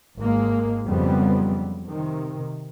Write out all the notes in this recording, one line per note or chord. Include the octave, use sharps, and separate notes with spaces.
G#1 G#3 A#3
F2 C#3 F#3 G3 B3 C4
C3 D#3